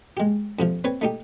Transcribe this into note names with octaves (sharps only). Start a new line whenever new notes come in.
G#3 G4
F2 C3 F3
C4 B4 C#5
A3 D#4 G4